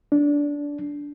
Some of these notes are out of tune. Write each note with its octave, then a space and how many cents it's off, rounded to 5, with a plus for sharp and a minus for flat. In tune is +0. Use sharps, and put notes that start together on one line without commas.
D4 -15